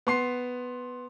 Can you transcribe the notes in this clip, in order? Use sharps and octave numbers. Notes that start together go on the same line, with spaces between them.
B3 C6 C7